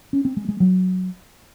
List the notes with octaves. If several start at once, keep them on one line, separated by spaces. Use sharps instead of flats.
C#4
C4
G#3
G#3
F#3